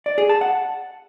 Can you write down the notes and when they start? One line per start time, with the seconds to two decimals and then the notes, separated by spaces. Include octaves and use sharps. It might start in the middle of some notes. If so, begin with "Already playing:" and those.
0.06 D5
0.18 G#4
0.30 A5
0.41 F#5